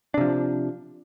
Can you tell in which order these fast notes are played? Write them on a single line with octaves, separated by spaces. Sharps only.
D4 C3 F3